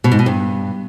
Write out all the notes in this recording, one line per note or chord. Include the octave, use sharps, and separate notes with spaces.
B2
G#2
B2
G2